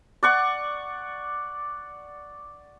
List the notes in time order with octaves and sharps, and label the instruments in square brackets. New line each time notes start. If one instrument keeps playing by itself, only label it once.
[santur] D5 F#5 C#6